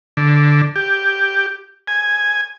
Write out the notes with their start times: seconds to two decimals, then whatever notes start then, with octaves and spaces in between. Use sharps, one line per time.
0.17 D3
0.76 G4
1.88 G#5